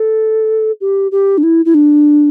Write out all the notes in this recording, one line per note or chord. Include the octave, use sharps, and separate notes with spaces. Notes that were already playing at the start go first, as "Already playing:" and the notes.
Already playing: A4
G4
G4
D4
E4
E4
D4